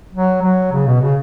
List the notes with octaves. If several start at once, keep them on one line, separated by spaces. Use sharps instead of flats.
F#3
F#3
C#3
B2
C#3